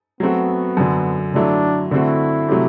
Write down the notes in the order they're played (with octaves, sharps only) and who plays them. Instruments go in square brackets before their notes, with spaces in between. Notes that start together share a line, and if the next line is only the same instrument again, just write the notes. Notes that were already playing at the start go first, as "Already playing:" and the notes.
[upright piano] F#3 A3 C4 F#4 [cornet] B3
[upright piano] F#2 D3 F#3
[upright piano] D3 F#3 A3 E4 [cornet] D4
[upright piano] D3 A3 C4 F#4 [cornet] E4
[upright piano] C3 F#3 A3 C4 G4